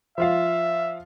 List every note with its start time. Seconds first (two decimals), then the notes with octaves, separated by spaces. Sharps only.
0.18 F3 F4 E5 F5